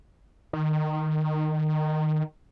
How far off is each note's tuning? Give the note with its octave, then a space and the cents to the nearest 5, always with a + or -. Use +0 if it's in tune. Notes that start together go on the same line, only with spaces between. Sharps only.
D#3 -15